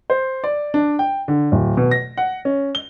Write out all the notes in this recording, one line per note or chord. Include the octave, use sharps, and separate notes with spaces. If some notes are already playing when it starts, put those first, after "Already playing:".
C5
D5
D4
G5
D3
D1
B2
A#6
F#5
C#4
G7